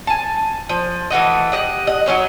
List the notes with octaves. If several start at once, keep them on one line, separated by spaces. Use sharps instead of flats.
G#5 A5
F3
E3 A3 F#4 D#5
G4 D#5 F#5
D#5 F#5
F#3 G3 C#4 D#4